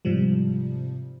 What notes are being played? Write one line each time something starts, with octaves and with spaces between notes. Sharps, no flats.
G#2 C3 F3 G3